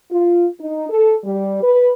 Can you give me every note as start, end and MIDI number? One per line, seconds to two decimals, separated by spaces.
0.11 0.47 65
0.60 0.87 63
0.90 1.16 69
1.24 1.60 55
1.63 1.91 71